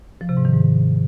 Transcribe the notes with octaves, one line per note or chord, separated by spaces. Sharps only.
F3
C3
G#2
D#3
G#2